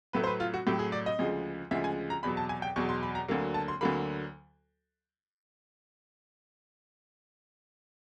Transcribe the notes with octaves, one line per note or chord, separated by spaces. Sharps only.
A2 F#3 A3 B4
C5
B4
F4
F#4
A2 F#3 A3 G4
G#4
D5
D#5
D2 C#3 F3 G#3
D2 C#3 F3 G#3 E5
G#5
A#5
E2 B2 F#3 B5
A5
G#5
G5
E2 B2 F#3 C#6
C6
B5
A#5
D2 D3 F#3 A#3
A5
C6
D2 D3 F#3 A#3 B5